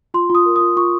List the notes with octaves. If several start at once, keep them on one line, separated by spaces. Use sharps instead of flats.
F4 C6
F4 D#6
A#4
D#6
F4
F4 C#6